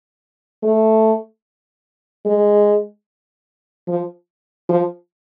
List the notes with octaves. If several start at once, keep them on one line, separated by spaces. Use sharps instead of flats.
A3
G#3
F3
F3